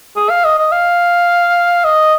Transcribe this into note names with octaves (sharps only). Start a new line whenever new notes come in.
G#4
F5
D#5
D#5
F5
D#5